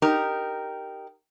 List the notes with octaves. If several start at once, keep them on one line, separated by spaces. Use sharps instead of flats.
D#4 G4 A#4